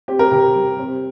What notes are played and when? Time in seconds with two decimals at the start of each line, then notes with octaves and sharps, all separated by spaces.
0.08 C4 G4
0.19 A#4
0.32 C3 G4
0.56 G3
0.79 C4